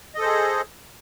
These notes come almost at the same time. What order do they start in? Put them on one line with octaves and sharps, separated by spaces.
D#5 A4 C5 G#4